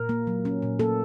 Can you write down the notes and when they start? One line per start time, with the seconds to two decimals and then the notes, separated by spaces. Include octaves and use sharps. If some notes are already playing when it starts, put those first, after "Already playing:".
Already playing: A#2 A#4
0.09 A#3
0.27 F#3
0.45 C#4
0.62 A#2
0.79 A#3 A4